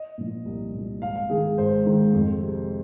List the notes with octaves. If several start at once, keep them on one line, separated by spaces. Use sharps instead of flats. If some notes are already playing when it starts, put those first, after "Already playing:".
Already playing: D#5
A#2 F3
C2
A#2 F3
G#1 F5
F5
G#2 D#3 G#3 G#4
G#1 C5
G#2 D#3 G#3
F2
C3 G#3